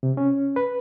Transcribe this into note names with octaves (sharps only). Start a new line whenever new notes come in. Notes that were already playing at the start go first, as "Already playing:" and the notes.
C3
C#4
B4